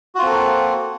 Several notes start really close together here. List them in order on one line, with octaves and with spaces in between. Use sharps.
F#4 F4 C4 A4 A#3